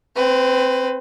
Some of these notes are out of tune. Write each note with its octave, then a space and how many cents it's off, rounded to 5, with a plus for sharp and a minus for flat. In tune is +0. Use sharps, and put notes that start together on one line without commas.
C4 +5 B4 +25